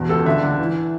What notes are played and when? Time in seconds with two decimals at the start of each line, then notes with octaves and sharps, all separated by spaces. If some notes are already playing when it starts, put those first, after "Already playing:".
Already playing: E2 B2
0.09 C#2 A4
0.25 D3 E5
0.43 D3
0.59 E3